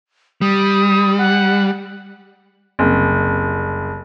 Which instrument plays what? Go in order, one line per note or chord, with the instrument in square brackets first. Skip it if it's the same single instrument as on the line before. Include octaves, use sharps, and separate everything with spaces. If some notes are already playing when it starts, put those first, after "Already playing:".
[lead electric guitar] G3 [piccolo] D#6
[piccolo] F#5
[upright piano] F#1 C2